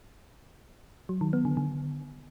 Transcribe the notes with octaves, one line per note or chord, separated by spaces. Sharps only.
F#3
D#3
B3
D3
D3